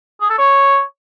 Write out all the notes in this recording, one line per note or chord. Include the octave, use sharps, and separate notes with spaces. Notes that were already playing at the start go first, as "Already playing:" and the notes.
G#4
A4
C#5